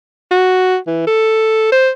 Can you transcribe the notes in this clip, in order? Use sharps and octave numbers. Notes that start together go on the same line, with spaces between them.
F#4
E3
A4
C5